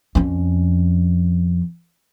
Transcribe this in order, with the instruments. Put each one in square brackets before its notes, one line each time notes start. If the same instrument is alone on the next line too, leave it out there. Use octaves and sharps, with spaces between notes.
[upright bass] F2 C#4